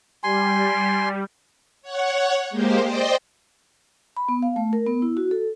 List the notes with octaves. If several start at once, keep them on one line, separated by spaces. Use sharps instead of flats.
G3 G#5 C6
C#5 F#5
G#3 A#3 G4 C5
C5 D5 D#5 G5
B5
B3
F5
A3
A#4
B3
E4
F#4
A4